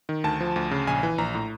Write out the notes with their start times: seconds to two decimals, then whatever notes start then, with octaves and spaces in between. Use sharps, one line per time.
0.09 D#3
0.24 D2 A5
0.41 F3
0.56 D2
0.71 C#3
0.87 A#1 G#5
1.03 E3
1.18 A#1 A#5
1.35 A2